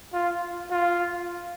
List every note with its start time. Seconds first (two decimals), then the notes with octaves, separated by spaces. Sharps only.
0.13 F4
0.71 F4